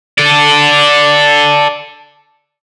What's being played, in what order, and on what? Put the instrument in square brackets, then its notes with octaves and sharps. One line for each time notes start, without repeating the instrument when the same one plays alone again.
[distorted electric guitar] A4 D5